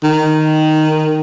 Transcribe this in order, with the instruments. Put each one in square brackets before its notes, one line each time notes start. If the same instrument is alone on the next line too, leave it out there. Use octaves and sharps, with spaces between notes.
[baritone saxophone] D#3